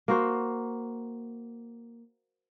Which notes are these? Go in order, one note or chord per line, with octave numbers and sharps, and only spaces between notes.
A#3 F#4 C5